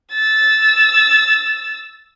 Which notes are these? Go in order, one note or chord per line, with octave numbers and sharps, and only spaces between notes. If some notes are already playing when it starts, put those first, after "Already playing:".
E6 A6